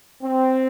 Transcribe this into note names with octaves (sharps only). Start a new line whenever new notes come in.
C4